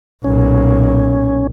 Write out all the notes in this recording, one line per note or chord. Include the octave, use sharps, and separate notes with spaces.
B1 A#2 C#4